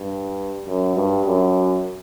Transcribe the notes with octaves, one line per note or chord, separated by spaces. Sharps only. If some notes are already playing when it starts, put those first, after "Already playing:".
Already playing: G2
F#2
G2
F#2